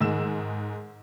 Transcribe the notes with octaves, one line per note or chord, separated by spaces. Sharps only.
G#2 D#3 G#3 E6 E7